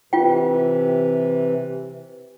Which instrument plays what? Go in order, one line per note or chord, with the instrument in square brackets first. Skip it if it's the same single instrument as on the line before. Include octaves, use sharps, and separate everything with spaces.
[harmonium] C3 E3 [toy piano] F4 G5